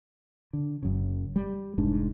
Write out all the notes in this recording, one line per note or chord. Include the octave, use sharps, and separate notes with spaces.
D3
F#1 F#2 C#3
G3
F1 G#2 D4